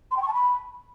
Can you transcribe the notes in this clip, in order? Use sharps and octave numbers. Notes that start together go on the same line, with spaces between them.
C6
G5
C#6
A5
B5